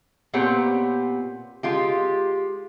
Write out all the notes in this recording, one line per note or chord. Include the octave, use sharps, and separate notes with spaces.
A#2 B3 C4 G4 C#5
G#3 F4 G4